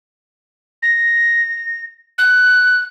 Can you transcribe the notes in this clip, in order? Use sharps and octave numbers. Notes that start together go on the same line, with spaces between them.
A#6
F#6